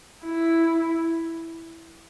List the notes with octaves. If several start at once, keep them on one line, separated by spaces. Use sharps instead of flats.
E4